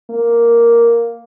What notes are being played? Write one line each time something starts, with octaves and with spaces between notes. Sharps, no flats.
A#3